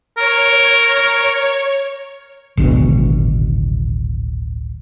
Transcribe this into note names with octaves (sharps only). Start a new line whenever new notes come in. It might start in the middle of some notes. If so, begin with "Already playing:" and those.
A#4 C#5
D1 G#1 D2 B2